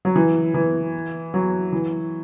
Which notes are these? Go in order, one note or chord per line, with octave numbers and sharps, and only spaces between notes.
F#3
E3
E3
F#3
E3